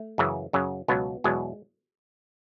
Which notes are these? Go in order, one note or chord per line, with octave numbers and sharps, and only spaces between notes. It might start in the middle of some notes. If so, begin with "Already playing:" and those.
Already playing: A3
F#2 C#3 E3
F#2 C#3 F#3
C#2 B2 F#3 B3
E2 B2 F#3 G#3